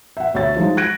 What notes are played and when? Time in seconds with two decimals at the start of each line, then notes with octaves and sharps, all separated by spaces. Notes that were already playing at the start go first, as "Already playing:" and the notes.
0.17 E5 F#5
0.34 D2 C#5 E5 A6
0.56 F3 F#3 G#3 D#4
0.77 F#6 G#6 A#6 D7